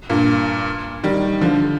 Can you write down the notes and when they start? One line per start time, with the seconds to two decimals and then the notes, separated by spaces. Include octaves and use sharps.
0.09 G2 A#2
1.04 D#3 G3
1.41 D3 F3